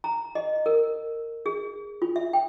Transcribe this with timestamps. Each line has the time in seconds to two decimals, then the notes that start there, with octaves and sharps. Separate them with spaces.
0.04 A#5
0.35 D#5
0.66 A#4
1.46 G#4
2.02 F4
2.16 E5
2.33 G5